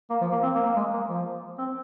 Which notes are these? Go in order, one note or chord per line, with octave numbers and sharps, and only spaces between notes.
A#3
F3
A#3
C4
A#3
A#3
G#3
A#3
F3
C4